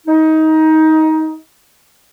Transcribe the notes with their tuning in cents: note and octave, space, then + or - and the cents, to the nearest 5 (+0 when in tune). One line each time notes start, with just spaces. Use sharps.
D#4 +20